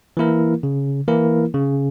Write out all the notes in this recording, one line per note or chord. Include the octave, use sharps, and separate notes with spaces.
E3 A#3 E4 A#4
C#3
E3 A#3 E4 A#4
C#3